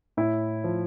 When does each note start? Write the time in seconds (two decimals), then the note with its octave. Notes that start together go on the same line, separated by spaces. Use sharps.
0.17 A2 E4
0.64 F3